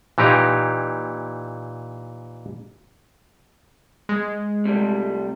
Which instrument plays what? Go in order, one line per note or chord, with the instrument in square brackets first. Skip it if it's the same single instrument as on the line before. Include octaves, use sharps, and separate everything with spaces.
[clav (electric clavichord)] A#2 E3 D#4 G4 A#5
[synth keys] G#3
[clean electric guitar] C3 G3 A3